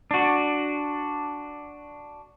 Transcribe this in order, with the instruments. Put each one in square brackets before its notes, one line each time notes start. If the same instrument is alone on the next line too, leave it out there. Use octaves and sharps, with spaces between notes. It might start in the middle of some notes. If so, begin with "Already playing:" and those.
[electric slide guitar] D4 F#4